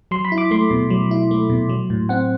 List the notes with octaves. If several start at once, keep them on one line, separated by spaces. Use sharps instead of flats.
F#3 C6
B5
E4
D6
A3 C6
B2
F#3
E4
A3
B2
F#3
A2
C4 F#5